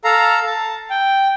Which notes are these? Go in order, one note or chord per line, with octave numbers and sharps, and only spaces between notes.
A4 F5 A#5
A5
G5